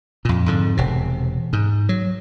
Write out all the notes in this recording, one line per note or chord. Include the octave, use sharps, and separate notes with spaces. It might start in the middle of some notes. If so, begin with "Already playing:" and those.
F2 A#2
F2 G#2 D3
E1 C3
G#2
F#3